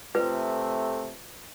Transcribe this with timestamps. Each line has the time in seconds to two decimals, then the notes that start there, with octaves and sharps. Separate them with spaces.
0.15 C3 A3 F4 B4